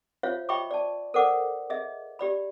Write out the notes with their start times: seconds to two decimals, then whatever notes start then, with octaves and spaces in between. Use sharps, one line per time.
0.23 F4 C5 C#5 E5 F5
0.49 D#5 E5 G5 B5 C#6 D6
0.71 D5 A5
1.14 A4 A#4 C5 D5 F#5 D6
1.70 G#4 D#5 E5
2.19 G4 D5 B5